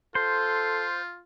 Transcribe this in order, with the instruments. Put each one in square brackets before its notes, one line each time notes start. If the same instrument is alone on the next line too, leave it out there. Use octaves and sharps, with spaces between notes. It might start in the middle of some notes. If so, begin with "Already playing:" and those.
[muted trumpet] F4 [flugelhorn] A4 [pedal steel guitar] C5